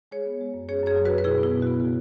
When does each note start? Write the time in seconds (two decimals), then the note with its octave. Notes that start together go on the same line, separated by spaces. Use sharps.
0.11 G#3 G#4 C#5
0.26 B3
0.41 G#3
0.54 F#2
0.69 C#4 G#4 C#5
0.83 F#2 G#4 C#5
0.96 F#3
1.05 F#4 B4
1.10 F#2
1.18 B4
1.24 B2 E4 G#4
1.38 B3
1.43 E4
1.53 B2
1.62 B3 F#4
1.80 C#3